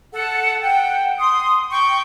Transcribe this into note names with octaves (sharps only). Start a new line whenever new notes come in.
A4 F#5
F#5 G5
C6 D#6
G5 C#6